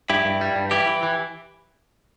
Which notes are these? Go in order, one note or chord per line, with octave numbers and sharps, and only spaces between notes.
G2 E4 G4
G2
G3
G2
E3 E4 G4
E3
E3